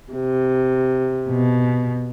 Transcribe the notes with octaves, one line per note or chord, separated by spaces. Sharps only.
C3
B2